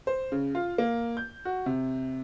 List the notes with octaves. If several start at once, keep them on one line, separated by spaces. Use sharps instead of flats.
C5
C#3
F4
A#3
G6
F#4
C3